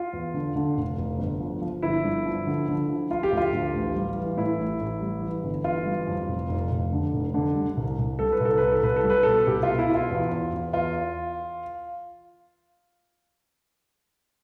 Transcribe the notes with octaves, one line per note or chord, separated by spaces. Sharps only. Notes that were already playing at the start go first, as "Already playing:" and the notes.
Already playing: F4
E2
D3
D3
F1
F1
G1
F3
F3
G1 E4
G2
F3
D3
D3
F3
F3 F4
G4
D2
F4
D2
A1
G3
E3
A2 E4
A1
A1
G3
E3
G1
E3 F4
G3
F2
F1
F1
F1
D3
F1
D3
G3
C2
C2
G3 A4
B4
C2
A4
C2 B4
A4
C2 B4
A4
G3
B4
B2 A4
C2 G4
F4
B2
E4
B2
F4
E2
E2
E2
E2 F4